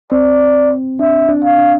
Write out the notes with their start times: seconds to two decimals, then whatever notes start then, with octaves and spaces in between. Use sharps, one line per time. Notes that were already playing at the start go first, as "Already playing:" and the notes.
0.12 C4 D5
1.00 D4 E5
1.29 D4
1.44 F5
1.59 D4